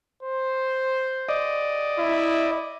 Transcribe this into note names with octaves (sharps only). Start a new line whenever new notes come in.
C5
D5 D#5
E4